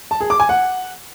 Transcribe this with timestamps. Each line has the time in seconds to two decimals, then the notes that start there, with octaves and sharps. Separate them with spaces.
0.11 A5
0.21 G#4
0.30 D6
0.40 G#5
0.49 F#5